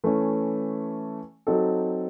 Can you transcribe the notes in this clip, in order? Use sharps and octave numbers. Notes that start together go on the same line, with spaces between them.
E3 A3 C#4
F#3 C4 D#4 A4